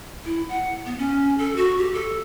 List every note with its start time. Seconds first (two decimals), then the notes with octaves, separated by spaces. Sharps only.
0.25 E4
0.49 F#5
0.86 B3
0.98 C#4
1.38 A4
1.56 F#4
1.78 G4
1.94 A4